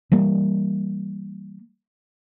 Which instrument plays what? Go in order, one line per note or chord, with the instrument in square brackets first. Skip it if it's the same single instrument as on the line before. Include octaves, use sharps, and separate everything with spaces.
[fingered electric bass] E3 G3 A#3